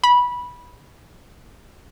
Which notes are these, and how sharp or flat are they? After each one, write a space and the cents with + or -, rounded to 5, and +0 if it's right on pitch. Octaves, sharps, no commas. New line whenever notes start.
B5 -15